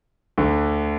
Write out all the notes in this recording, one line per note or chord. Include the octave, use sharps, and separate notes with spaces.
D2 D3